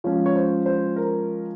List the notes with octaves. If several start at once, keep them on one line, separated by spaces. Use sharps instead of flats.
F3 G#3 C#4 C#5
C#5
C5
C5
A#4